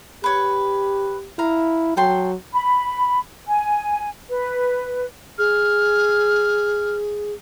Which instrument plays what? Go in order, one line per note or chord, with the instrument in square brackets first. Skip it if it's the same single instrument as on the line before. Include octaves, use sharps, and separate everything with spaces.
[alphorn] G4 [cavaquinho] B4 C#5 C#6
[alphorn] E4 [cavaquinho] F5 A#5
[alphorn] F#3 [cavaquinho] A4 G5 C6
[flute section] B5
G#5
B4
[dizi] G#4 [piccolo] F6